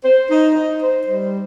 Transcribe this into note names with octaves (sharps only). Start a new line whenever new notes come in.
C5
D#4
D#4
C5
G3